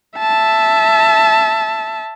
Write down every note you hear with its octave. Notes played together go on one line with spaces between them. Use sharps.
E5 A5